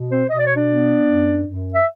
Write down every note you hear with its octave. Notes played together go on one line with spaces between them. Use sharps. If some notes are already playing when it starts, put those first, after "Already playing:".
Already playing: B2
C4 C5
B2 D#5
D5
C#5
D4 D5
B3
F#2
F#2
E5